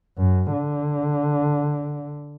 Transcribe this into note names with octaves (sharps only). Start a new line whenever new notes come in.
F#2
D3